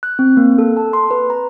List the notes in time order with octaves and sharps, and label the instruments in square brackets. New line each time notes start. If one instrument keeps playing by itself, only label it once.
[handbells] F#6
C4
A#3
A4
A5
C6
B4
A#5